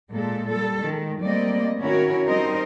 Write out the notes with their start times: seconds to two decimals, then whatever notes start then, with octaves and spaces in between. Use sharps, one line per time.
0.10 A#2 G#3 A4
0.48 G3 A4
0.82 D#3 G#3
1.22 G3 A3 A#3 C4 D5 D#5
1.81 D#3 C#4 E4 F#4 A#4 C#5
2.27 G3 C4 D#4 A#4 C5 D#5